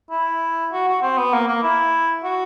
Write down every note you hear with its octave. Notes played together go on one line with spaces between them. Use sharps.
E4
F#4
F#4
C4
B3
A#3
A#3
E4
F#4